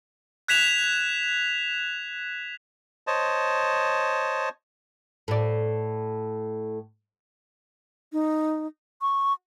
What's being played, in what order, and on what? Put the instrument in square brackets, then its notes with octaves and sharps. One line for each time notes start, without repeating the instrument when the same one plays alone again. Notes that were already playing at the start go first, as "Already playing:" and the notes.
[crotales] F#6 G#6 B6 E7 F7
[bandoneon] C5 C#5 D#5 A5
[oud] A2 D5
[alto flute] D#4
C#6